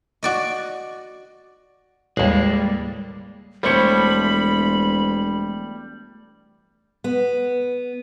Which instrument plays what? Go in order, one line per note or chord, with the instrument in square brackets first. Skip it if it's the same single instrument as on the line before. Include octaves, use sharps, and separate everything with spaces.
[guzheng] F#4 D5 D#5
[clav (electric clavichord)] A1 D#2 [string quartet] G3 [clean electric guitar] G#3 A#3
[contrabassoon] E1 [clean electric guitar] G3 A3 C#5 [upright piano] C5 C#7 [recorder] B5
[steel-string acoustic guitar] B3